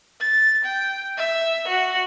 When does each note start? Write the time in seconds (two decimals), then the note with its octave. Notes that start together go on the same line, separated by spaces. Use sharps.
0.20 A6
0.65 G5
1.17 E5
1.68 F#4